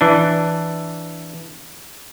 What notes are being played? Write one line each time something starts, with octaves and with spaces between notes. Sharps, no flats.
E3 D4